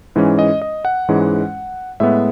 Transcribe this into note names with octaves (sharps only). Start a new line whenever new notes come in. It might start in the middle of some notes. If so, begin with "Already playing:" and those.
G#2 E3 G#3 C#4
D#5
D#5
F#5
G#2 E3 G#3 C#4
A2 G#3 B3 E5